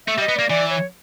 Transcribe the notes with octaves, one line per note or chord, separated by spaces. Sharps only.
A3 E5
G3
D#5
B3
A#3 D5
E3 D5
C#5